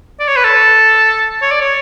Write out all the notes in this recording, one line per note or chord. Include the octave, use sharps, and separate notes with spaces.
D5
C#5
B4
A4
C#5
D5
C#5